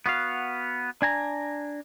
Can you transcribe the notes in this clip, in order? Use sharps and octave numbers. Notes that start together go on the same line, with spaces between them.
B3 F#4 F5
D4 G#5 A#5